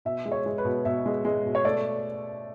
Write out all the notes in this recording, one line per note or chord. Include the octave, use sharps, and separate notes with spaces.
B2 E5
G#3
C#5
G#3
B4
B2
B2 E5
G#3
G#3
B2
C#5
A3 D5